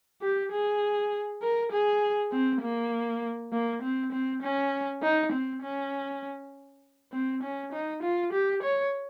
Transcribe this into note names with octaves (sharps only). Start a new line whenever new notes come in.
G4
G#4
A#4
G#4
C4
A#3
A#3
C4
C4
C#4
D#4
C4
C#4
C4
C#4
D#4
F4
G4
C#5